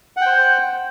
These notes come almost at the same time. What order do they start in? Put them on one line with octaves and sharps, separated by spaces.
F#5 G5 C5